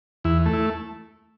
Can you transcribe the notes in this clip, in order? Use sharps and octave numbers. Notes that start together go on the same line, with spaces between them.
E2 E4
A3
E4